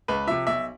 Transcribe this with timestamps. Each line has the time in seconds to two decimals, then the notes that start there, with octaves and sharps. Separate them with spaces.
0.08 C#2 B4
0.27 C3 F3 E5
0.47 B1 E5